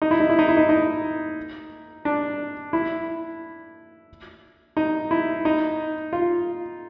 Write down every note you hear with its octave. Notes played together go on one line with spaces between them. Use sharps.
D#4
E4
D#4
E4
D#4
E4
D#4
D#4
D4
E4
D#4
E4
D#4
F4